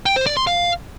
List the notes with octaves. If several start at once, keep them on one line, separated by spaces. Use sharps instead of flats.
G5
C5
D5
C6
F5